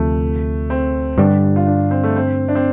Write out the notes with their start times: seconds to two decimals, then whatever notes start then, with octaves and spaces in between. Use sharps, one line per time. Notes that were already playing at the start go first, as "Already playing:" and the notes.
Already playing: D2 C3 F3 A3
0.70 C4
1.18 G2 D3 G3 D4
1.56 F4
1.67 D4
1.91 C4
2.03 A3
2.16 C4
2.48 D4
2.55 C4